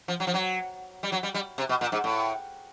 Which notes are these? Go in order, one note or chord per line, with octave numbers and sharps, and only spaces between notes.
F3
F#3
F3
F#3
G3
F#3
G3
G3
C3
B2
A#2
G#2
A2